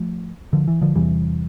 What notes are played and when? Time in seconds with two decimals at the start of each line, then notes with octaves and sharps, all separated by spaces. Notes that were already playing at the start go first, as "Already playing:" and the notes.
Already playing: F3 A3
0.53 D3 F3
0.68 E3
0.82 D3 F3
0.95 E2 C3 E3 G3